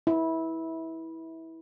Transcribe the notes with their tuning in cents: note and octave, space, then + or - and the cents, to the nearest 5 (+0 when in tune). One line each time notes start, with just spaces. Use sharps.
E4 -20